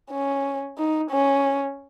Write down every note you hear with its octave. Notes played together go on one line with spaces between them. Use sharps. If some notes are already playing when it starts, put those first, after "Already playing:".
C#4
D#4
C#4